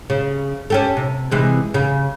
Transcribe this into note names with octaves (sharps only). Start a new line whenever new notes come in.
C#3
C#4 G4 A4
C3
C3 E3 G#3
C#3